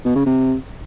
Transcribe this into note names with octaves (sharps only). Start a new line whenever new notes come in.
B2
C#3
C3